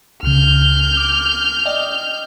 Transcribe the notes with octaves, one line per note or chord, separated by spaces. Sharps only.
C#2 C#3 F6 G6
D6
D5 D#5 G5